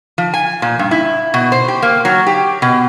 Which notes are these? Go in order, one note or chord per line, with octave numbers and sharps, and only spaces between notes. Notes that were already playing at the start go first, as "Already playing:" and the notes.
F3
G#5
A#2
G2
E4
B2
C5
G4
A#3
F#3
G4
B2